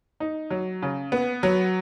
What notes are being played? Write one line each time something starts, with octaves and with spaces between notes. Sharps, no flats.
D#4
F#3
C#3
B3
F#3